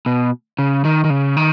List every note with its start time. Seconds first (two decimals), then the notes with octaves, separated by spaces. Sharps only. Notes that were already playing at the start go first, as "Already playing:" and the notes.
0.06 B2
0.59 C#3
0.85 D#3
1.04 D#3
1.10 C#3
1.37 D#3